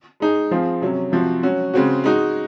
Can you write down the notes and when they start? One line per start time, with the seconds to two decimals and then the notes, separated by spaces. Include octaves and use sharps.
0.20 G#3 D#4 G#4
0.51 F3 C4 F4 G#4
0.82 C3 F#3 C#4
1.12 C3 F3 C4 F#4
1.43 F#3 C#4 F#4
1.74 C#3 G#3 C4 F#4
2.04 G#3 D#4 F#4